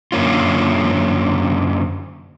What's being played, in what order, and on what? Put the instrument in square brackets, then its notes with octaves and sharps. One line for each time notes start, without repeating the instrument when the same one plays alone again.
[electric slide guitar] F#2 D3 A#3 C#4 F4